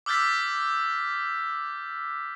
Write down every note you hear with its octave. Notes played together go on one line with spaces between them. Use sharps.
D6 E6 F6 G6 A6 B6